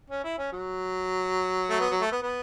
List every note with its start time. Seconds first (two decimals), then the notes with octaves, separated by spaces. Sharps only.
0.10 C#4
0.24 E4
0.38 C#4
0.52 F#3
1.70 A3
1.80 B3
1.90 F#3
2.01 A3
2.12 B3
2.22 B3